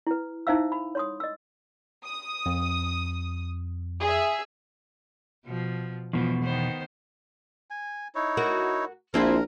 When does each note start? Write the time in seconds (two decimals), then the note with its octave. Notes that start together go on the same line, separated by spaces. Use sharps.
0.07 E4 B4
0.47 D#4 E4 C5 E5 F5 E6
0.72 B5
0.95 C#5 C6 D#6
1.20 D#5 E6
2.04 D#6
2.46 F2
4.00 G#4 E5
5.46 B2 F3
6.13 E2 G#2 B2 F3
6.43 D#3 B3 C5
7.70 G#5
8.15 D#4 E4 C#5
8.37 F#4 A#4
9.14 A#1 C4 E4 F4 A#4